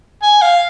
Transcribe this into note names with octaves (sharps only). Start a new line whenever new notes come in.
G#5
F5